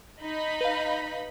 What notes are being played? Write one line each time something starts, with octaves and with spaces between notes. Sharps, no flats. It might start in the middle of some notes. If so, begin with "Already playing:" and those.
D#4 D#5 B5
B4 F5